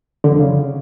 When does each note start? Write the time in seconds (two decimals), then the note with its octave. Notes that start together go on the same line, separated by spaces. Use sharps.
0.24 D3
0.31 F2
0.39 C#3